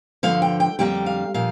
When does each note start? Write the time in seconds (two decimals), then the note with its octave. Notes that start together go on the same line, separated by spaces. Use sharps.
0.23 G2 D3 F3 F5
0.42 G5
0.60 G5
0.79 F2 D3 G3 A#3 G5
1.06 F5
1.34 A#2 F3 F5